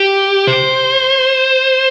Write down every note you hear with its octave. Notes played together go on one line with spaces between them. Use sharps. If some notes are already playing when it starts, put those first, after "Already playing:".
Already playing: G4
C5